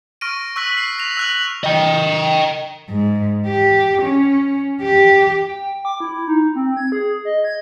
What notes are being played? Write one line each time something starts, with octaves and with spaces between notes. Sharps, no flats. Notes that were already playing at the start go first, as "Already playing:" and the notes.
C#6 F6 A#6 D7 D#7
C#6 E6 F#6 B6 F#7
C7
A#6 F7
E6 F#6 F#7
D#5 G5
G#2
G4
C#4
G4
G5
D6
E4
D#4
C4
G#6
G#4
D#5
G#6